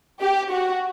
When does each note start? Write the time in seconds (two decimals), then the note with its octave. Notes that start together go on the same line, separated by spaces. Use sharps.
0.20 G4
0.51 F#4